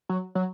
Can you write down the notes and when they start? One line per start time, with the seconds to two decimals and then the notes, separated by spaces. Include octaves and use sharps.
0.09 F#3
0.35 F#3